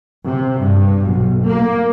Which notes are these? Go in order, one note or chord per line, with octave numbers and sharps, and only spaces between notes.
C3
G2
B1
A#3